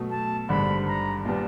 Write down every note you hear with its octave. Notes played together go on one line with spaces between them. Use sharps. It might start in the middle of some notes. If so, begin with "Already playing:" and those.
Already playing: B2 F#3 A3
A5
G#1 G2 D3 B5
A#5
A#2 G3 B3 A5